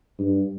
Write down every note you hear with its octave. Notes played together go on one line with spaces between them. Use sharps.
G2